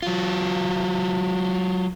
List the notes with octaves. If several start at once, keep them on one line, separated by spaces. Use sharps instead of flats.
F#3 F4